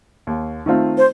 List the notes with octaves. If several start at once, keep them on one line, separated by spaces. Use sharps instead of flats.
D#2
D#3 A3 C4 F4
C5